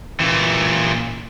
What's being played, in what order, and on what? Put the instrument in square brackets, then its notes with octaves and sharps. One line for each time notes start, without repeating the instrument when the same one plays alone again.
[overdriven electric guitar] A#2 E3